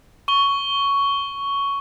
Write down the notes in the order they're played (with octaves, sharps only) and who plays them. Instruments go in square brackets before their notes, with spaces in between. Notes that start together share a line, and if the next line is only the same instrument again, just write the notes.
[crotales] C#6 G7